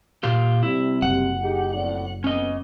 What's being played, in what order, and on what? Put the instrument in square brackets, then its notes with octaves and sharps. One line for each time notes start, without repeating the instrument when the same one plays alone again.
[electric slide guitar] A#2 F4 G4
[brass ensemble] C3 G3 [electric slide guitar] E4
[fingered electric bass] F#1 [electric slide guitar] F#5
[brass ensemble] D#4 G4 G#4
F2 A2 D5
[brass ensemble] F2 B3 [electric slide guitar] C#4 D#5